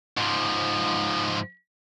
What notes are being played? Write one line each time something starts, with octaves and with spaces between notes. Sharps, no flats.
G#2 F3